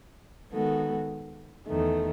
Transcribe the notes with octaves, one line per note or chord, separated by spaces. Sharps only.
D#3 G#3 B3 F#4 A4
E2 D#3 A3